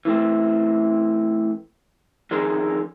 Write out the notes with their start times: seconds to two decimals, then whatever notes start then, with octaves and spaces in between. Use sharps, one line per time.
0.05 E3 A3 C4
2.31 F2 D3 D#3 G#4 A#4 C5